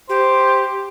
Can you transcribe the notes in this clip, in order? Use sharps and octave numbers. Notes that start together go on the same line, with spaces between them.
G4 C5